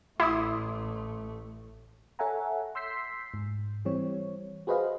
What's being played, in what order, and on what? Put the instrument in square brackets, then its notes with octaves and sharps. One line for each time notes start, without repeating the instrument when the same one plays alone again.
[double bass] A1 A3 [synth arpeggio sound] E4 [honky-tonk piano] C6 D6 D#6
[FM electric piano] A4 C#5 E5 F#5 G#5 A#5
C6 E6 G6 B6 C7
G#2
E3 G3 C4 C#5
F#4 G#4 B4 C5 D#5 F5